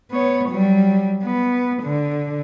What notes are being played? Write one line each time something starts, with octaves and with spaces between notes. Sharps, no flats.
B3 C#5
F#3 G3
B3
D3